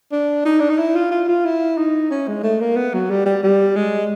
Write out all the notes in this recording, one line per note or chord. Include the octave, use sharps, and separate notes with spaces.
D4
D#4
D4
D#4
E4
F4
F4
F4
E4
D#4
C#4
G#3
A3
A#3
B3
F#3
G3
G3
G3
G#3